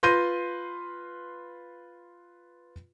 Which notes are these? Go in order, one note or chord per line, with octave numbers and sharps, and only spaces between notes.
F4 B4 C6 G6 A#6 D#7